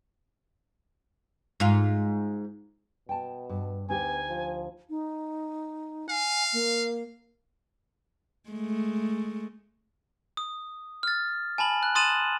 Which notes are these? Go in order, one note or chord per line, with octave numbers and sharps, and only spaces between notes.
G#2 F4
B2 G5 A5
G2
D2 B3 D#4 G4 G#5
F3
D#4
F5 G#5
A#3
G#3 A3
D#6
F6 A6
G#5 A5 B5 F#7
F#6
C6 D#6 A6 D#7 E7 F#7